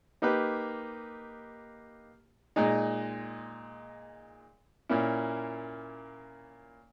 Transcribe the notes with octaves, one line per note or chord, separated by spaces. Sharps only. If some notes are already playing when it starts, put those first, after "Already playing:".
A#3 D#4 G4 B4
A#2 G#3 D#4
A#2 A#3 C#4 E4